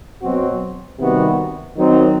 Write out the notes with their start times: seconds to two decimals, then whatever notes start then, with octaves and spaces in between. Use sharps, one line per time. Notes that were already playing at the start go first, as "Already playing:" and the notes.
0.22 B2 F#3 C4 F#4
0.99 C3 D#3 G3 B3 F#4
1.77 D#3 F#3 C4 D#4